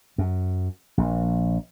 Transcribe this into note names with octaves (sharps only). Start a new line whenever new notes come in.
F#2
A#1